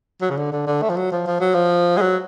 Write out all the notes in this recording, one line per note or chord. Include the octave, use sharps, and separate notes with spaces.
F#3
C#3
D3
D3
D3
A3
F3
F#3
F3
F3
F#3
F3
G#3
F#3